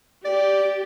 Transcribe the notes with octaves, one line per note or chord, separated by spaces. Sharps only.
G4 D5